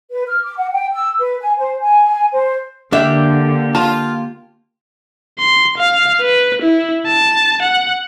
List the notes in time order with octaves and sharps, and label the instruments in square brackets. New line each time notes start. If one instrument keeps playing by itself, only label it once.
[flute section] B4
F6
D6
F#5
G5
E6
B4
G#5
C5
G#5
C5
[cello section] D3 [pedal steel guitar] A#3 G4 [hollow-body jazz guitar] D4 D5 E5
[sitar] F4 [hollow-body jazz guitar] A5
[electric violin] C6
F5
B4
E4
A5
F#5